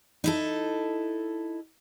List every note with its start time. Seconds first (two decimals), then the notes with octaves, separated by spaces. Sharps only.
0.24 D#4 E4 A4